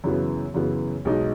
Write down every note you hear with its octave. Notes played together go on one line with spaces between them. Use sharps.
F#2 C#3 E3 B3
F#2 C#3 E3 B3
B1 B2 G#3 D#4